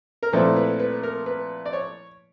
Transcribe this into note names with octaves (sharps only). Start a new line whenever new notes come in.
A#4
A#2 F3 A3 C4 E4 B4
B4
B4
A#4
B4
D5
C#5